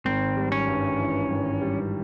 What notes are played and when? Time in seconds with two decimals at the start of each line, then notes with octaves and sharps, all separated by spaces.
0.05 G#1 C4
0.37 G3
0.52 C#4
0.68 G2
1.00 E3
1.30 G#1
1.61 G3